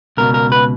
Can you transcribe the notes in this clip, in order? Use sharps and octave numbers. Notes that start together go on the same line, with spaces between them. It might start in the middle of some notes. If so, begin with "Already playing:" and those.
C#2 B2 A#4
A#4
B4